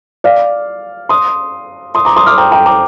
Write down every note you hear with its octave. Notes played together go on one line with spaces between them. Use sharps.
D5 F5
C6 D#6
C6 D#6
A#5 D6
C6 D#6
D6 F6
G5 A#5
G5 A#5
A#5 D6